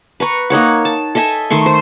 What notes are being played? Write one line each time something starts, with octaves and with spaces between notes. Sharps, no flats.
B4 A#5 C#6
A#3 D#4 C#5 F#5
A5
A4 D#5 E5 G#5
D#3 A3 C6 C#6
C5